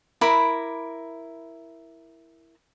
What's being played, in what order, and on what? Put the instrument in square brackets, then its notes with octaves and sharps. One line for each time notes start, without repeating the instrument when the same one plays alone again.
[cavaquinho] E4 A#4 B5 D6